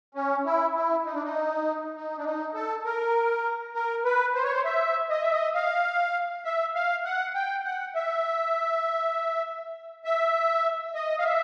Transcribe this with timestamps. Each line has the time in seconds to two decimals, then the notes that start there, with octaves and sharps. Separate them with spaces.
0.15 C#4
0.45 E4
0.75 E4
1.05 D#4
1.14 D4
1.23 D#4
1.96 D#4
2.17 D4
2.25 D#4
2.54 A4
2.85 A#4
3.75 A#4
4.05 B4
4.35 C5
4.44 C#5
4.52 C5
4.65 E5
5.10 D#5
5.22 E5
5.33 D#5
5.55 F5
6.45 E5
6.75 F5
7.05 F#5
7.35 G5
7.64 F#5
7.95 E5
10.05 E5
10.95 D#5
11.19 F5
11.25 E5